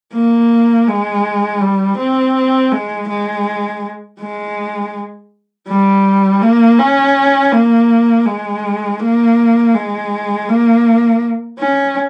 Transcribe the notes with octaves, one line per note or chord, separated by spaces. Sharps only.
A#3
G#3
G3
C4
G#3
G#3
G#3
G3
A#3
C#4
A#3
G#3
A#3
G#3
A#3
C#4